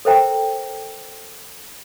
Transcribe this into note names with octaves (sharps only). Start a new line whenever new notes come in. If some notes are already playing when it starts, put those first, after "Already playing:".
A4 A#4 C5 E5 G5 A#5